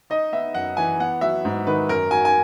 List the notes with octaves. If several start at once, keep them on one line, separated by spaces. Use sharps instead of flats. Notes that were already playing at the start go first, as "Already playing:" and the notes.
D#4 D#5
B3 E5
F#2 F#5
E3 G#5
B3 F#5
F#3 E5
G#2
D#3 B4
F#2 A#4
F#3 G#5
G#5